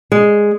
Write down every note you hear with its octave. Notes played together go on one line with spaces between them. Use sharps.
G#3